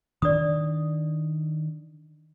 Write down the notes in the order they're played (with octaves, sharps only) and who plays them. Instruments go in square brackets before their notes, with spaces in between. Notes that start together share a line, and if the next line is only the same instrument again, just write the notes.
[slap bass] D#3 D4 [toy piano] D5 D#6